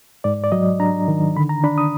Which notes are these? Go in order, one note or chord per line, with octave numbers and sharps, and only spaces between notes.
G#2 D5
D5
F#3 D#5
D4 A#5
D#3
D3 B5
A#5
D4 B5
D#6